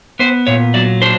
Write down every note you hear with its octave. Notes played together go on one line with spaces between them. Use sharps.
B3 C5
A#2 C#5
F#3 D5
D4 C5